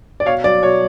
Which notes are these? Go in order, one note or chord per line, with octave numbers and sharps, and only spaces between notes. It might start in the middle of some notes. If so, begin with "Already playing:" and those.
D5
B2 C#5 F5
F#3 D5
B2 C#5